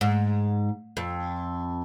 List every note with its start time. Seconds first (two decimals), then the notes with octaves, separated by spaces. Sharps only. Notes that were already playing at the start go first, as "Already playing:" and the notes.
0.01 G#2
0.97 F2